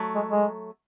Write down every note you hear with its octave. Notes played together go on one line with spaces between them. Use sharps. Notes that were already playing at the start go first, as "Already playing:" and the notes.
Already playing: F#3 A3
G#3
G#3